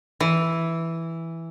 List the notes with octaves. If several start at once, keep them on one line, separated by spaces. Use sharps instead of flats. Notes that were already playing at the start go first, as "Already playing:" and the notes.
E3